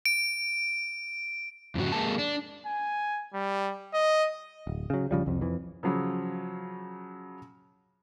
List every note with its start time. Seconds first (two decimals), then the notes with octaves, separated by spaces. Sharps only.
0.05 D7
1.75 F2 G#2 C#3 F#4
1.92 G#3 A#3 A5
2.19 D4
2.66 G#5
3.34 G3
3.94 D#5
4.67 D1
4.90 C#3 F#3
5.11 G1 C#3 F3 G3
5.26 C2 F2
5.41 F2 E3
5.83 C#3 F3 F#3